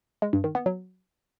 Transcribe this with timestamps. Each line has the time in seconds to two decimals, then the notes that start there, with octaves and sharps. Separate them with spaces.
0.22 G#3
0.33 G2
0.44 D#3
0.55 B3
0.66 F#3